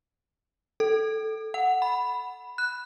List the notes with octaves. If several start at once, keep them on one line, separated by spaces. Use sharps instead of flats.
A4
F#5
B5
F#6